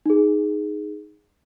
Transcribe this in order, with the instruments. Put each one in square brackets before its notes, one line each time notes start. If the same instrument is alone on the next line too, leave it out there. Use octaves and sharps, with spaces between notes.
[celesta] D#4 G#4